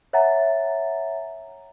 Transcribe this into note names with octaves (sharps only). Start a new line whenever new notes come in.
C#5 E5 F#5 G#5 A#5 A6